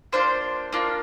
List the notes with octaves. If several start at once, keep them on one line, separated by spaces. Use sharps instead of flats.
A#3 D4 F4 C5
A#3 D4 F4